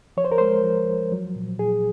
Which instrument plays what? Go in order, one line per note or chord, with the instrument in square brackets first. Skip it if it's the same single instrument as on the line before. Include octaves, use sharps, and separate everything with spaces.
[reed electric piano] F3 C#5
C5
A#4
G#3 C5
F3
F3
F#3
A#2
A#2 G#4